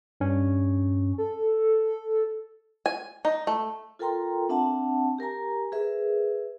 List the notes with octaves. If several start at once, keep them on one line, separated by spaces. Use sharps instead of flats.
G2 C#4
A4
G#5
D#4
A3
F4 A4 A#4 G5 A#5 C6
C4 D4 E5 F#5 A5
G4 A#4 G#5 A#5
G#4 A#4 B4 E5